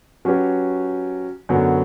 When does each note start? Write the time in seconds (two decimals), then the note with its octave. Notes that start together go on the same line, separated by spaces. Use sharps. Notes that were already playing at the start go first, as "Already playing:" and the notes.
0.25 F#3 C#4 G4 B4
1.49 F#2 D3 F#3 B3